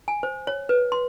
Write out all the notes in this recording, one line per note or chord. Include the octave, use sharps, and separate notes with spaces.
G#5
C5
C#5
B4
C6